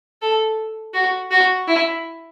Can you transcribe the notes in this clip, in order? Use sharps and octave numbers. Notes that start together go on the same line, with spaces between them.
A4
F#4
F#4
E4